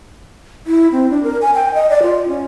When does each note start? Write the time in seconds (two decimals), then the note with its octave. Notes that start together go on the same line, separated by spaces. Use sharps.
0.67 E4
0.92 C4
1.10 D4
1.23 A#4
1.42 G#5
1.55 G5
1.74 D#5
1.90 D5
2.03 F4
2.28 C#4